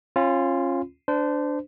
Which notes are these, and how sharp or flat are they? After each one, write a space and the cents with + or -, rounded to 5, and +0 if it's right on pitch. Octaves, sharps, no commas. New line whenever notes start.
C#4 -30 F4 +0 B5 +45
D4 +0 C5 -30